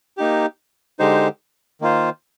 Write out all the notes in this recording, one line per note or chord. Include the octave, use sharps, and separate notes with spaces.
A#3 D#4 G4
D3 G#3 D#4 G4 C5
D#3 A#3 F4 C5